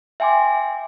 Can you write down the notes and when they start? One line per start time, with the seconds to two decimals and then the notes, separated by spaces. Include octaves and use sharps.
0.20 E5 G5 G#5 C6 D6